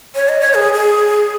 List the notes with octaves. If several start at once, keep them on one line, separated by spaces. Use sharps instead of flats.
C#5
D#5
C#5
G#4
G#4